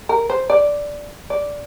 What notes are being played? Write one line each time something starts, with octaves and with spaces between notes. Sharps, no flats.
A#4
C5
D5
D5